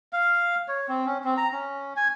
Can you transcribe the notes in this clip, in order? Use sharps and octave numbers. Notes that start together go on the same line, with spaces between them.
F5
C#5
C4
C#4
C4
A#5
C#4
G#5